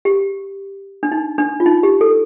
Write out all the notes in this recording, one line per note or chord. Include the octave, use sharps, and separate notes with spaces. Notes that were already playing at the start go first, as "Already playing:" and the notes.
G4
D4
D#4
D4
F4
D#4
G4
A4